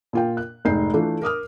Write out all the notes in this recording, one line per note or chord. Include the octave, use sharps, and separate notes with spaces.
A#2 F4 G5
F#6
F1 G#2 D#4 G#4 G6 C7
E3 A3 D4 F4
A#4 D6 D#6 F6